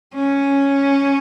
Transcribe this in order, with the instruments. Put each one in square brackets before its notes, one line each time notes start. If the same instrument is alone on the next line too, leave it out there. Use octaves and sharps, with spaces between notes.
[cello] C#4